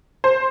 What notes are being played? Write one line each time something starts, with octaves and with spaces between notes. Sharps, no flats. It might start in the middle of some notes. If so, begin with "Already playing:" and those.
C5